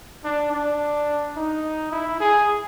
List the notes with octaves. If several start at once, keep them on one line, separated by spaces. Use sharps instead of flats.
D4
D4
D#4
E4
G#4